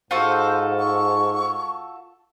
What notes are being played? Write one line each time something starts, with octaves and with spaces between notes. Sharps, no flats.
G#2 F4 F#4 A4 C5
C#6